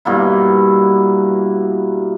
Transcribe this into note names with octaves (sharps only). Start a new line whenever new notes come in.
G2 B2 A#3 E4